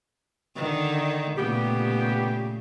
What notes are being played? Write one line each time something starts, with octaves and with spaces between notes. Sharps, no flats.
D3 D#3
A#2 C#3 A3 B3 G4